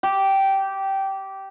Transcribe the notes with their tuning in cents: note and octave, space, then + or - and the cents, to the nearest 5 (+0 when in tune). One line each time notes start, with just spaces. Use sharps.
G4 -15